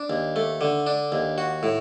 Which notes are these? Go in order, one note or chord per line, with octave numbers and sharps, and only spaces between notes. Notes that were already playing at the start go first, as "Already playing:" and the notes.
Already playing: D4
D#2
A3
D3
D4
D#2
F#4
A2